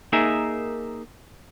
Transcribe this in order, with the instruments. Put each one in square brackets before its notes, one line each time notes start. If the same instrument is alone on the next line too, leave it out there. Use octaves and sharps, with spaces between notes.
[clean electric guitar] A#3 D#4 G#4 A#4 E5